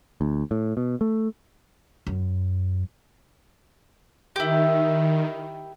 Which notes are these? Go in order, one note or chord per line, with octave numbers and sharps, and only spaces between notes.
D2
A2
B2
A3
F#2
D#3 E4 G4